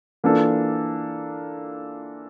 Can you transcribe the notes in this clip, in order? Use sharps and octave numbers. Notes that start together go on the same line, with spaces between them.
E3 A#3 D4 F4 A4